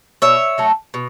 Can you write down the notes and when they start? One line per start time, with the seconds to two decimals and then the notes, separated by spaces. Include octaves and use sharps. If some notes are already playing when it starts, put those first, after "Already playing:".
0.22 B2 C#5 E5
0.58 F#3 A3
0.94 B2